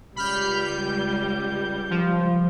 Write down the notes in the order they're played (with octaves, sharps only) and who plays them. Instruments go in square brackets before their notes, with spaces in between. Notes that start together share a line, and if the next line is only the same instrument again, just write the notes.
[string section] C#2 G3 [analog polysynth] B5 F6 G6
[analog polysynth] G6
F3